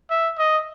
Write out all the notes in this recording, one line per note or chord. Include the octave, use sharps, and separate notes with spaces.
E5
D#5